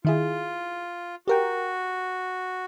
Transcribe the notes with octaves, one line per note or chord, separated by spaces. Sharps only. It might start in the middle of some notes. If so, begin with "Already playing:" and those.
D#3 E4 F4 G#4
F#4 G4 A#4 G5